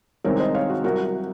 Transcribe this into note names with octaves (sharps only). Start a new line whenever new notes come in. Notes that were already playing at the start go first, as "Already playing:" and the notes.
C2 C3 D#3 G#3 C4 A#4 C#5
C5 D#5
C#5 F5
F#4
C2 C3 F#3 F#4 A#4
F#4